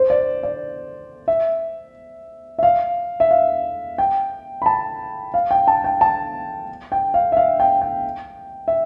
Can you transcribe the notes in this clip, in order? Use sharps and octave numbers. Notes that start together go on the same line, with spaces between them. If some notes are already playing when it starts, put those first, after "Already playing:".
Already playing: C5
D5
D5
E5
E5
F5
E5
F5
G5
B5
A5
F5
G5
A5
G5
A5
G5
F5
E5
F5
G5
G5
E5